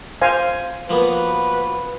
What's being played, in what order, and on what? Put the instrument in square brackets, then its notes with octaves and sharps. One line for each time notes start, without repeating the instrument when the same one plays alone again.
[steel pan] C5 F5 G#5
[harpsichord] F3 A#3 B3 [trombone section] F#4 B4